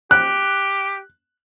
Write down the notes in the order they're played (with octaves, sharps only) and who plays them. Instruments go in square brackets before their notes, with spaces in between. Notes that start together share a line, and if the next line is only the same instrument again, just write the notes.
[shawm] G4 [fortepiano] F#6